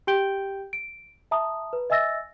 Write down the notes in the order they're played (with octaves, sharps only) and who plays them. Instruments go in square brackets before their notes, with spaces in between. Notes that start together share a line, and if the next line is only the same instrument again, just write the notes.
[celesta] G4 G5 G6 D7 G7
D7
E5 A5 A#5 D#6
B4
D#5 E5 G#5 E6 A6 A#6